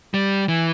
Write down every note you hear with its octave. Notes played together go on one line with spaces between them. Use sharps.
G3
E3